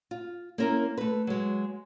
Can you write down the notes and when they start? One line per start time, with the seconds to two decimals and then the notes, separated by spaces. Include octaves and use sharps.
0.11 F4
0.58 A#3 C4 C#4 E4 A#4
0.97 A3 B4
1.27 F#3 G#3